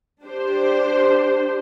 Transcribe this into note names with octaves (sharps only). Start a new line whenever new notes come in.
D4 G4 C5